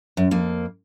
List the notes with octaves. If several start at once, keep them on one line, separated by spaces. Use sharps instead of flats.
F#2
F2 A#3